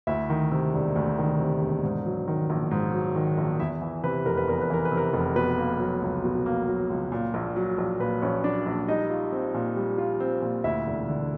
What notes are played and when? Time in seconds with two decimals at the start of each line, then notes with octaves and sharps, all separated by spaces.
0.07 D2 E4 E5
0.30 D#3
0.52 C3
0.73 E1
0.96 D2
1.18 D#3
1.39 C3
1.62 E1
1.84 G#2
2.05 F#3
2.28 D#3
2.50 A#1
2.71 G#2
2.94 F#3
3.16 D#3
3.38 A#1
3.60 E2 E4 E5
3.82 E3
4.04 C3 B4
4.26 F1 A#4
4.37 B4
4.48 E2 A#4
4.61 B4
4.70 E3 A#4
4.85 B4
4.92 C3
4.97 A#4
5.13 F1
5.36 B2 B4
5.58 A#3
5.80 F#3
6.02 C#2
6.24 B2
6.46 A#3
6.68 F#3
6.90 C#2
7.12 A#2
7.34 A#1
7.56 F#3
7.78 A#1
7.99 A#2 B4
8.22 A#1 C#4 C#5
8.44 F#3 D4 D5
8.66 A#1
8.88 G3 D#4 D#5
9.10 F4
9.32 C4
9.54 A#2
9.76 G3
9.98 F4
10.20 C4
10.42 A#2
10.64 D2 E4 E5
10.86 E1
11.08 D3